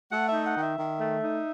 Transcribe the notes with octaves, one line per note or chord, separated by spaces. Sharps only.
A3 F#5
E5
D#4
F#5
D#3
E5
D#3
A3
D#4